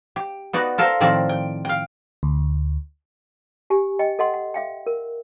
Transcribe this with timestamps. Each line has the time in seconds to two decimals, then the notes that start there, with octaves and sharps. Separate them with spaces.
0.16 G4
0.53 B3 D#4 F#4 D5
0.78 F4 A4 A#4 C5
1.00 A2 D#3 F3 C4 A#4 D5
1.29 G5
1.65 F5 G5
2.23 D2
3.70 G4 G#5
3.99 D#5 G5
4.19 A4 D#5 F#5 C6
4.34 F#5
4.54 E5 F5 G5
4.86 A#4